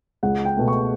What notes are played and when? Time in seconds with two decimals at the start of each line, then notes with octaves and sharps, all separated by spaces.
0.23 C#2 F#5
0.45 G5
0.57 B2 A3
0.68 C#6